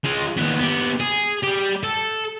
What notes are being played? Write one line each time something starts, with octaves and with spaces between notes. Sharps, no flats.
G#3 F4
D#2 B3
B3 G4
G#4
G3 G4
A4